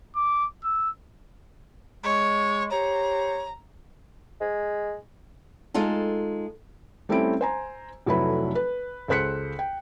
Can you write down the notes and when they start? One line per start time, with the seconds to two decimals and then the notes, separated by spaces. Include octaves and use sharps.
0.16 D6
0.64 E6
2.04 G#3 C#5
2.72 G4 C5 C#5 A#5
4.41 G#3
5.74 G#3 D#4 F4 A4
7.09 G3 A3 C4 C#4 E4 D7
7.41 C5 G#5 A#5
8.06 F1 F#3 A3 E4 B4 B5
8.55 B4
9.08 C#2 A4 C5 F#6 B6 C#7
9.59 G5